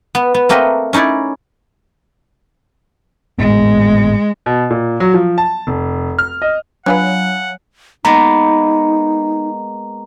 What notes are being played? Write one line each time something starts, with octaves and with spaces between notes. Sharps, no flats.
B3
B3
A3 A#3 C4 A#4 B4 D#5
C#4 D#4 E4 C#5 D5
G#1 A2 G#3 B3
B2
A#2
F#3
F3
A5
F1
F6
D#5
F#3 D4 F4 B4 F5 F#5 G#5 F#6
G#3 A#3 B3 D#4 A#5